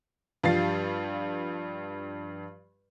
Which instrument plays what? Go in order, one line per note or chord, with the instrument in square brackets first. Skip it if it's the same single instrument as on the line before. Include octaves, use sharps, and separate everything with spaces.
[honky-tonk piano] G2 F3 G3 F5 A6 C7